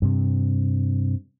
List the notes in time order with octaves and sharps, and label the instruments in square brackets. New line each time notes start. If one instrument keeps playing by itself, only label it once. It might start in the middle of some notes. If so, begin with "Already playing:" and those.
[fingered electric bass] G2 C3